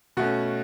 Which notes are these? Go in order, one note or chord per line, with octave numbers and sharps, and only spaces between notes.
B2 A3 C#4 F#4